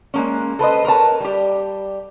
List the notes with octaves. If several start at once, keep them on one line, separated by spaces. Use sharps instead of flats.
G#3 A#3 C#4
A4 B4 C5 D#5
A#4 B4 C#5 A5
G3 G4